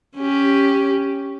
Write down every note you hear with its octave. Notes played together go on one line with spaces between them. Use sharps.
C#4 G4